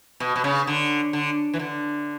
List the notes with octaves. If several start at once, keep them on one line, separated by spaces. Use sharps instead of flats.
B2
B2
C#3
D3
D3
E3
D3